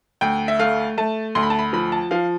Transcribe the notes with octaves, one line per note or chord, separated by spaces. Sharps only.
D2 G5
E5
A3 F5
A3 A5
D2 C6
B5
A5
B5
F3 B5
A5
F3 F5